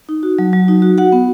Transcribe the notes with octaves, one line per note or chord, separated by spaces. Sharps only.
D#4
F#4
F#3
F#3
D#4
F#4
F#4 F#5
B3